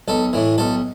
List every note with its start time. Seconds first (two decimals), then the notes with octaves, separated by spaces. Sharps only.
0.08 B1 A4
0.33 A2 E3
0.58 B1 A4